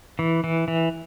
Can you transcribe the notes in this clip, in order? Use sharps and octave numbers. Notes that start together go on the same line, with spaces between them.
E3
E3
E3